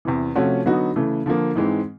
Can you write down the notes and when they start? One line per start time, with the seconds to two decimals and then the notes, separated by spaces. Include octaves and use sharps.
0.05 E2 C3 E3
0.35 C3 F3 A3 C#4 F#4
0.66 D3 F#3 B3 D#4 F#4
0.96 C#3 E3 A3
1.26 D3 F3 A#3
1.55 G#2 E3 G#3 C4